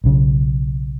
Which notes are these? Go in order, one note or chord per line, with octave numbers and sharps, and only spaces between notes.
B1 C#3